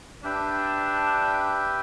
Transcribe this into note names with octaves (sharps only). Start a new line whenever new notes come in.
D4 G4 B4 E5 G5